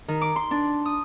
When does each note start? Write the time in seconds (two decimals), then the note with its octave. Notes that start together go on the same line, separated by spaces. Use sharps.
0.08 D#3
0.22 D6
0.36 C6
0.51 D4
0.86 D#6